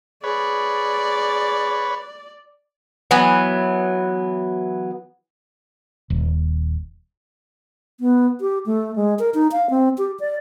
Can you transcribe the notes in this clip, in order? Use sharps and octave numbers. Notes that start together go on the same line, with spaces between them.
G#4 B4 C#5 D5
E3 F#3 B3
D#1
B3
G4
A3
G#3
A#4
D#4
F5
C4
G4
D5